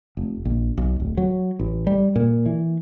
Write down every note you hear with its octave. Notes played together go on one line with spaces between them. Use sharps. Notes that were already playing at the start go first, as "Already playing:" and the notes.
F1
A#1
B1
D1
F#3
A1
G3
A#2
E3